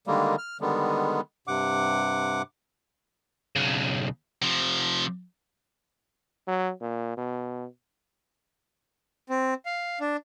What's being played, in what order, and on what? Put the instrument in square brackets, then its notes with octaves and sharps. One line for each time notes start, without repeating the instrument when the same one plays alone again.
[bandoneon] D3 D#3 G3 G#3 A#3
F6
D3 D#3 G3 G#3 B3
G2 C3 F#5 D6
[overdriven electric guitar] B1 C#3
[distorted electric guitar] C3 F3
[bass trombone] F#3
A#2
B2
[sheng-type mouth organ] C4
F5
D4